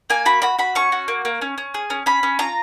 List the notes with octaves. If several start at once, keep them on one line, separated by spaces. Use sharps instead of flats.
A#3 G#5
F#4 B5
F#4 B5
F#4 B5
C#4 C#6
F#4
A#3
A#3
C#4
C#4
G#4
C#4
C#4 B5
C#4
F4 A#5